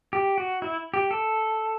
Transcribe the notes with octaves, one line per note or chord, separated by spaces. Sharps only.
G4
F#4
E4
G4
A4